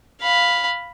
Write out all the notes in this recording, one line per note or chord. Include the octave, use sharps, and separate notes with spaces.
F5 B5